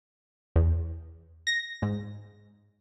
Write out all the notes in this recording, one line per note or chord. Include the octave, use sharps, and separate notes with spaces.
E2
A#6
G#2